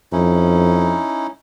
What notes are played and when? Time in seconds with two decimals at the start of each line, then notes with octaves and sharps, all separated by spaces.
0.12 F2 C#4 D#4 E4